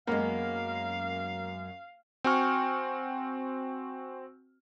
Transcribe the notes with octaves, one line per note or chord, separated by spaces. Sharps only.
F#2 G#3 A#3 B3 F5
C4 F#4 G5 G#5 C#6 F6